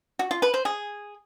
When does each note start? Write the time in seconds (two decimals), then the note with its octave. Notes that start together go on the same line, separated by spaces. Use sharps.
0.19 F#4
0.31 F4
0.42 B4
0.54 C5
0.65 G#4